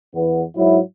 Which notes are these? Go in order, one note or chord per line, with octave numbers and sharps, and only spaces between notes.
E2 B3
G#2 F#3 E4